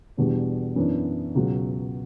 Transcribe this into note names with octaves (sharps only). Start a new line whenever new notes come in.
E2 B2 G3 B3 D4
F#2 E3 B3 D4
C#2 B2 F#3